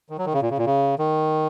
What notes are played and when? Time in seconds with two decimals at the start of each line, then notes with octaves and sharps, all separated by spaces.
0.10 D#3
0.18 F#3
0.26 D#3
0.33 C#3
0.42 A#2
0.50 C#3
0.58 A#2
0.66 C#3
0.99 D#3